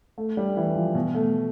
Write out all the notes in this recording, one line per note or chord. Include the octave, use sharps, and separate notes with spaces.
A3
G3
E3
F3
B2
A3